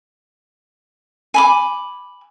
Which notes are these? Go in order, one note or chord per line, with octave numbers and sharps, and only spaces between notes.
G#5 B5 D6